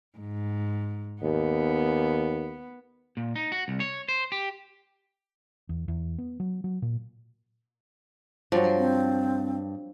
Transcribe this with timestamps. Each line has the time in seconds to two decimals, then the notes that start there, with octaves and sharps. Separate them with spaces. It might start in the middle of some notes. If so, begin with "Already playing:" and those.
0.18 G#2
1.22 D#2 B3
3.17 A#2
3.36 D#4
3.52 F#4
3.68 C2
3.80 C#5
4.08 C5
4.32 G4
5.69 E2
5.88 E2
6.18 B3
6.40 F#3
6.64 F#3
6.82 A#2
8.52 G2 F3 F#3
8.78 C4